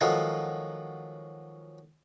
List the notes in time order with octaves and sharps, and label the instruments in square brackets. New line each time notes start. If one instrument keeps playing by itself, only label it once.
[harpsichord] D#3 F3 F#3 G#3 F4 A4